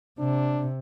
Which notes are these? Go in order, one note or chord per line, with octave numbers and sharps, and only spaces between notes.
C3 D4